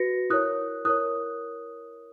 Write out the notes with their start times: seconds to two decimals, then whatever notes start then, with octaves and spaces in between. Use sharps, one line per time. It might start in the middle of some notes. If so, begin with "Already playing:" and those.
Already playing: F#4 B4 A#6 C#7
0.30 E4 A#4 C#5 D#6 F#6
0.85 E4 A#4 C#5 D#6 F#6